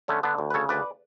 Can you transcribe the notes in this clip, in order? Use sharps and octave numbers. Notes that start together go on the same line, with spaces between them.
D3 A3 C#4
D3 B3 D4
D2
B4
C#3 A4 C#5
D2 B4 D5